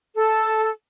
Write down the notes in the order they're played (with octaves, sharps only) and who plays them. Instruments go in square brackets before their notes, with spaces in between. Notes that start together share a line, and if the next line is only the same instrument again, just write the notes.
[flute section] A4